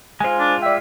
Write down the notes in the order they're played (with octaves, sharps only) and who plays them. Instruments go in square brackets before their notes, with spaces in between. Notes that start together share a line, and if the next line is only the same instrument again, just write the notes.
[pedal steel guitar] G#3 F4 [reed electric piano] C5 G#5
[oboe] D4
[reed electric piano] D5 G5 [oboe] E5